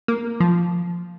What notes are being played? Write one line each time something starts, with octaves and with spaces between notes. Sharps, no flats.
A#3
F3